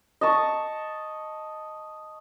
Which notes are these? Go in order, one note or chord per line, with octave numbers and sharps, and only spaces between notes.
D#5 A5 C#6